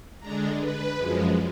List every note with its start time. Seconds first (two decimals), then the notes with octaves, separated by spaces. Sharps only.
0.20 D3 G#3 D4 A#5
0.58 B4
0.96 F#2 F3 G#3